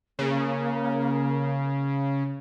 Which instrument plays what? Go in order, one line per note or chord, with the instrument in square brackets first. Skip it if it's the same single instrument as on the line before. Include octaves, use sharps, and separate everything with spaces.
[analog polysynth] C#3 [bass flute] A#3